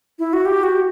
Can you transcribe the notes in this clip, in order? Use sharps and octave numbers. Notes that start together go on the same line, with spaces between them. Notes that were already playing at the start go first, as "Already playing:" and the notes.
E4
F#4
G4
F#4